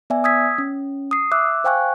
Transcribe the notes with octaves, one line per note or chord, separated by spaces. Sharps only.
B3 D5 E5 G#5
D#6 E6 G#6 B6
C#4
D#6 C7
E5 D6 E6 F#6
C5 F5 G5 G#5 C#6 F#6